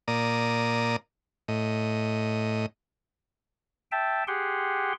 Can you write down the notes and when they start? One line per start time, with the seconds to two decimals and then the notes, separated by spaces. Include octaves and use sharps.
0.08 A#2 D5 A#5 D#6
1.48 A2 D#5
3.92 E5 G5 A5
4.28 G4 G#4 F#5 G5 C6